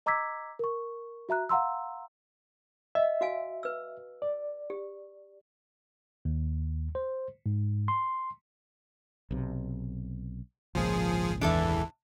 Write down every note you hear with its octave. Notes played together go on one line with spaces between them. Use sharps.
D#5 A#5 D6 E6 G#6 B6
A#4 C#6
F#4 E5 A#5 F#6
F5 F#5 A#5 C6 E6
D#5 E5
F#4 F5 G#5
B4 E6
D5
G4
D#2
C5
G#2
C6
B1 C3
G#1 C#2 A#2 F3 G#4
E2 E3 D4 A4 E5